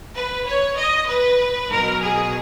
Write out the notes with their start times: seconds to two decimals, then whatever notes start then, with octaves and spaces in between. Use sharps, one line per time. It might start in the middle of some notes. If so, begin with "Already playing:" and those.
0.16 B4
0.48 C#5
0.77 D#5
1.09 B4
1.70 B2 F#3 A#4
2.02 G#4